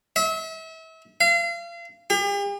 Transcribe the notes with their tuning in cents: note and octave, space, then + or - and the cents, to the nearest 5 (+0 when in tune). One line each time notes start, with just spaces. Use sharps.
E5 -35
F5 -35
G4 +45